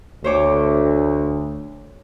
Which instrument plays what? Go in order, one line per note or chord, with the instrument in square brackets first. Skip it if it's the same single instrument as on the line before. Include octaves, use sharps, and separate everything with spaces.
[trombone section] D2 [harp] C5 C#5 D6